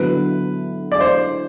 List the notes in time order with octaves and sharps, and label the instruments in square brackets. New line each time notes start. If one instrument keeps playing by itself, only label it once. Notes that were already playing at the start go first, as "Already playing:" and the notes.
Already playing: [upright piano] D3 F#3 B3 E4 [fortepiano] B4
[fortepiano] D5
C5